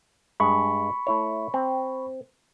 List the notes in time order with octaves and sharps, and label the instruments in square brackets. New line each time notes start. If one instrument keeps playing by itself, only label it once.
[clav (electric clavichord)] G2 G#3 [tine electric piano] B5 C#6
[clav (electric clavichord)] A3 E4 C#5
C4